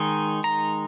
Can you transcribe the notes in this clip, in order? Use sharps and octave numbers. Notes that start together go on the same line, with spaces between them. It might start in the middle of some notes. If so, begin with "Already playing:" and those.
Already playing: D#3 G#3 D#4
A#5